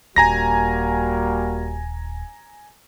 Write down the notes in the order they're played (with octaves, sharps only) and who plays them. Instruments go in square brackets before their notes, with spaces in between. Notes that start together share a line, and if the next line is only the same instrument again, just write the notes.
[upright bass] D#1 [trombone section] G3 A#3 F#4 [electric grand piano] G#5 A#5 A#6